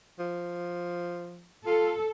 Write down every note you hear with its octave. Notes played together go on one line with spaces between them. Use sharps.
F3
F4 A4